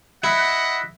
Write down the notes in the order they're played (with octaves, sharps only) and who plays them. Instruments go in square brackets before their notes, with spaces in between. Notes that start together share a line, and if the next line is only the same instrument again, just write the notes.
[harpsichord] E4 [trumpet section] D#5 E5 F#5